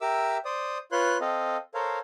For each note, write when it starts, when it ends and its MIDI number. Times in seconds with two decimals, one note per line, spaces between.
0.01 0.38 67
0.01 0.38 70
0.01 0.38 76
0.01 0.38 86
0.01 0.38 88
0.45 0.78 72
0.45 0.78 74
0.45 0.78 87
0.92 1.18 65
0.92 1.18 71
0.92 1.18 73
0.92 1.18 84
0.92 1.18 90
1.21 1.57 60
1.21 1.57 69
1.21 1.57 75
1.21 1.57 77
1.74 1.99 69
1.74 1.99 70
1.74 1.99 72
1.74 1.99 73
1.74 1.99 77